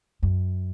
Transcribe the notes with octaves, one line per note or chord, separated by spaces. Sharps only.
F#2